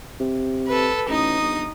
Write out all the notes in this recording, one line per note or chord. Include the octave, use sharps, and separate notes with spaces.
C3
A4 B4
A1 D#4 D#6
G1